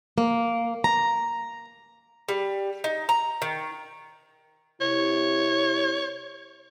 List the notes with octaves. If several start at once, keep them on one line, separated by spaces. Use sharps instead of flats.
A#3
A#5
G3
D#4
A#5
D#3
C3 E4 C#5